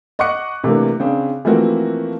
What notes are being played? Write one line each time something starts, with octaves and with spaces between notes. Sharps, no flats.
D#5 F#5 C#6 D6 F#6 C#7
C3 E3 A3 A#3 D4
C#3 C4 D4
E3 F3 A3 A#3 C4 F#4